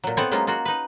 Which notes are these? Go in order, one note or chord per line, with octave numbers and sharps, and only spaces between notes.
A#2 F#3
B3 C4 E4 A4 B4 C#5
F#3 G#3 A#3 C#4 F4
A#3 F4 F#4
D#4 B4